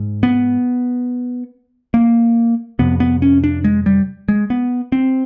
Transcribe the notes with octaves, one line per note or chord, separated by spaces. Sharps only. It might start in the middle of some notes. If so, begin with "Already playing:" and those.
Already playing: G#2
B3
A#3
F2 C3 B3
B3
C#4
D4
G#3
G3
G#3
B3
C4